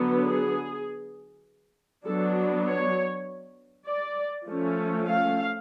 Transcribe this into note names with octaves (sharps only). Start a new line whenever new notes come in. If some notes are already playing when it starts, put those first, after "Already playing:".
Already playing: D3 F#3 B3
G#4
F#3 B3 D4 A4
C#5
D5
F3 A3 C#4
F5